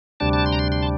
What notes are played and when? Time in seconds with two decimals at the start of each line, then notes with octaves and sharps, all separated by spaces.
0.20 D2 C3 G3 D4 A5
0.33 A5
0.46 C6
0.53 A#5
0.59 C6
0.72 C6
0.83 A5